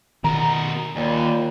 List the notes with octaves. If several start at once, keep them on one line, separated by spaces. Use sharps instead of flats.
B2 D#3 A#4 A#5
D#2 A#2 G3